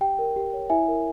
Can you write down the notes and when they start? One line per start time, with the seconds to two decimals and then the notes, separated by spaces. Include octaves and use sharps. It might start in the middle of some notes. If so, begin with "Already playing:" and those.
0.01 G4 G5
0.19 A#4
0.36 G4
0.53 C#5
0.70 E4 E5 G#5
0.88 A#4